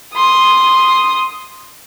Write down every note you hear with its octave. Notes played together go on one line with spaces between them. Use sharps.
C6 D#6